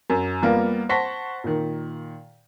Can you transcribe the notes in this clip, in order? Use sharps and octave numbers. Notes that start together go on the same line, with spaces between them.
F#2
G3 A#3 B3 F4 A#4
C5 F#5 A5 C#6 A#6 B6
A#2 D#3